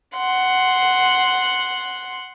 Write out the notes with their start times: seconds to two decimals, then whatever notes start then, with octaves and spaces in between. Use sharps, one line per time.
0.17 F#5 C6